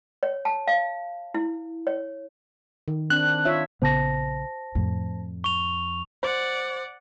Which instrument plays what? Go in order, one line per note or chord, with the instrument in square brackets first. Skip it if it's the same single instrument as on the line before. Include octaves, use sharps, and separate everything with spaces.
[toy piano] C#5
A5
F5
E4
C#5
[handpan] D#3
[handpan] C4 D4 [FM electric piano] F#6
[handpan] F4 C#5 E5
[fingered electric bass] A#1 C#3 B3 [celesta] C5 A5 A#6
[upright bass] F2 [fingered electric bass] A2
[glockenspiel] C#6 F7
[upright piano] C5 [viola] D5 F#5